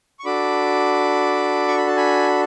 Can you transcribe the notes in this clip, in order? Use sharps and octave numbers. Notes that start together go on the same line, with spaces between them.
C#6
D4 F#4 A4 B5 D6
C#6
B5
A5
G#5 B5